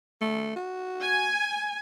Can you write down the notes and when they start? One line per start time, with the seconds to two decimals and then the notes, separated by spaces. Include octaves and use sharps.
0.22 A3
0.56 F#4
1.03 G#5